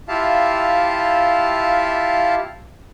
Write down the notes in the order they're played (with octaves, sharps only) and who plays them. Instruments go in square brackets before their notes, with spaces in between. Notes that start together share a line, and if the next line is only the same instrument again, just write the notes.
[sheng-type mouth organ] E4 F4 G4 E5 F5 A5